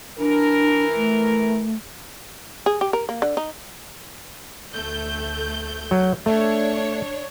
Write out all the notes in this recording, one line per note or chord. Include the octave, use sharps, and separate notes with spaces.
E3 D4 A#4
A3
G#4
G4
A#4
A#3
D3
D#4
D2 A3 G6
F#3
A3 D4 C#5